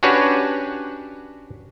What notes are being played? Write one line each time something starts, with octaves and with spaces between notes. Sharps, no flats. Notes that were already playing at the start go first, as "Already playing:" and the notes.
C#4 D4 F#4 G4 B4 C#5